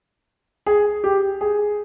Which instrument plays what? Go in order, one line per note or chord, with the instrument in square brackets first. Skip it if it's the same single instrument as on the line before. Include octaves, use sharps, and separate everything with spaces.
[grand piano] G#4
G4
G#4